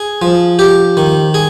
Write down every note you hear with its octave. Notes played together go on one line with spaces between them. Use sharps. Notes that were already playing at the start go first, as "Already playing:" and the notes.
Already playing: G#4
F3
G4
D#3
G#4